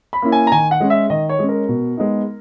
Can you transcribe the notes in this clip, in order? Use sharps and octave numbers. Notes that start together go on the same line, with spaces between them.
B5
A#3 C#4 E4
G#5
A#5
D#3 G#5
F#5
G#3 C#4
E5
D#3 D#5
C#5
G#3 C#4
A#4
B2
G#3 B3 D#4